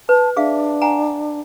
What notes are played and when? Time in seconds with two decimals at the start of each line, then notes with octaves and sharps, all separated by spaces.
0.09 B4 A5
0.36 D4 G#4 E5 F5
0.81 F#5 G#5 A#5